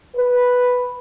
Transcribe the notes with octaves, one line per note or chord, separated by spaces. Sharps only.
B4